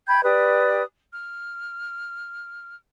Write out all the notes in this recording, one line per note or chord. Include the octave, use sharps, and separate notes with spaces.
G5 B5 G6 G#6
G4 B4 D5 D#6
F6